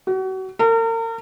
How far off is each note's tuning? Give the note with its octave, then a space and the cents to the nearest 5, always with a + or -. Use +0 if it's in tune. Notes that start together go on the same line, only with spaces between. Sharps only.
F#4 +35
A#4 -40